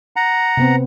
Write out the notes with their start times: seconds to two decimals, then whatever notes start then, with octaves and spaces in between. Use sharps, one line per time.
0.16 F#5 A#5
0.57 C3 B3 C4